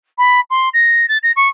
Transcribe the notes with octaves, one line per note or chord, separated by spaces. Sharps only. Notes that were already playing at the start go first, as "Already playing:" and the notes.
B5
C6
A#6
A6
A#6
C#6